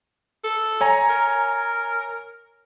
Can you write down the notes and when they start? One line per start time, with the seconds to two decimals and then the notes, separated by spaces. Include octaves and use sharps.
0.44 A4
0.81 C#5 G#5 A#5
1.09 A#4